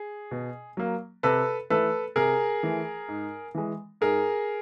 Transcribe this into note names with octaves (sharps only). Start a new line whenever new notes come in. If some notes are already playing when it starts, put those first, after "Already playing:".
Already playing: G#4
B2
F#3 A#3
C3 A4 B4
E3 A3 A4 B4
C3 G#4 A#4
E3 A3
G#2
E3 G#3
G#2 G#4 A#4